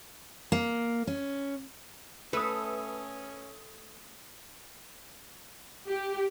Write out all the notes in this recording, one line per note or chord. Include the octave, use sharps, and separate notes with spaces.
A#3
C#4
A3 C#4 B4 D#6 E6
G4